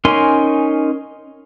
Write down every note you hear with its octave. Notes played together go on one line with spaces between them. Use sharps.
C#4 D#4 A#4 G#5 C6